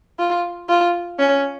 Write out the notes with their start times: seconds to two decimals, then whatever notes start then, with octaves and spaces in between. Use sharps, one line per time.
0.19 F4
0.69 F4
1.18 C#4